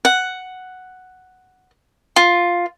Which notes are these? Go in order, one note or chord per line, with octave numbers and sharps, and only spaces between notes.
F#5
F4